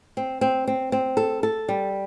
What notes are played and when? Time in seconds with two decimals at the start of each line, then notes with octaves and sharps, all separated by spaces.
0.17 C4
0.41 C4
0.67 C4
0.92 C4
1.17 A4
1.43 A4
1.69 G3